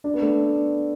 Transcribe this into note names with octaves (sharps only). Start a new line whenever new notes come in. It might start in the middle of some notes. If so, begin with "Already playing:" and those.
D4
B3
A3 D4